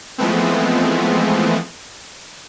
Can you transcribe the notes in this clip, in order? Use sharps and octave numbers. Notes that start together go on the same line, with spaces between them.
E3 F3 G#3 A3 B3 C4